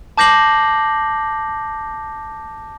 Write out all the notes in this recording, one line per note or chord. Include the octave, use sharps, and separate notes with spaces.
A5 D6 G6 A#6 C7 F#7